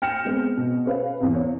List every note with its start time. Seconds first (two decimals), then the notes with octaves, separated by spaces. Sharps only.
0.02 G5 F6 A#6 C#7 E7
0.25 G#3 B3 C4
0.57 B2
0.85 C#4 B4 F5
1.20 E2 C3
1.34 C#5